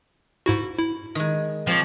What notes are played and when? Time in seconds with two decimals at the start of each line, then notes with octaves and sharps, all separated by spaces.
0.46 G#2 E4 F#4
0.78 E4
1.15 D#3 G#3
1.67 F3 C4 C#5 D5